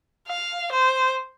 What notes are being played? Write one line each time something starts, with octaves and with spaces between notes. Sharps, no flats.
F5
C5